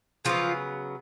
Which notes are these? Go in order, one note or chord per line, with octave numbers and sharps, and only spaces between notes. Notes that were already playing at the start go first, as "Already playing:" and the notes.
C#3 F3 F#3 B3 F4